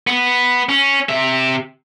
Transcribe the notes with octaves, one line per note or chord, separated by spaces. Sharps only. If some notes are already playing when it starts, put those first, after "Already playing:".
B3
C#4
C3 E5